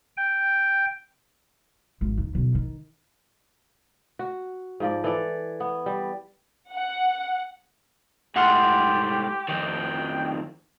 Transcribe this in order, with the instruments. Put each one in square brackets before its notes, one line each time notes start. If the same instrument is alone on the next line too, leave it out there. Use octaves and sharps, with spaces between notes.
[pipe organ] G5
[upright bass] G#1
D#2
B1
D#3
[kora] F#4
G#2 F3 D5
E3 A4 D5
B3
G3
[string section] F#5
[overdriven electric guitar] G#2 A3 [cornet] G4 [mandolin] F#5 C6 F6
[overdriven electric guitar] F2 D#3 [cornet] G5